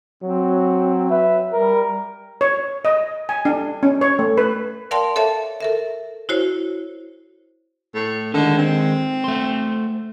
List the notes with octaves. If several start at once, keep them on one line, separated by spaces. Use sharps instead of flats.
F#3 C4
B4 E5
G3 A#4
C#5
D#5
G#5
D4
C#4
C#5
A3
B4
A#4 D5 F5 G5 A5 C6
A4 C#5 E5 A5
A4 A#4 E5
E4 F#4 C5 C#5
A2
D3 D#3 G#3
C4
A3 C5